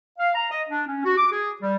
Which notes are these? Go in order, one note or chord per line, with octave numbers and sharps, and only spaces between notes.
F5
A#5
D#5
D4
C#4
F#4
D6
G#4
G3